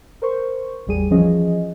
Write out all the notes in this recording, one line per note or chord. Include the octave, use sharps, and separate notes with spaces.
A#4 C5 C#6
A1 E2 G3 G#4 D#7
E3 F3 C#4 G#4 D#5